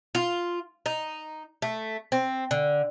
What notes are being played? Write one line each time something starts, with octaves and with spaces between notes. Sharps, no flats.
F4
D#4
A3
C4
D3